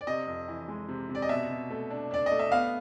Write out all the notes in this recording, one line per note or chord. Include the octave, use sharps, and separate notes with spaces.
D5
C3 D#5
F2
E3
G#3
C3
C3
D5
D#5
B2 E5
B2
A3
D4
D4 D5
D#5
A3
E5
B3 F5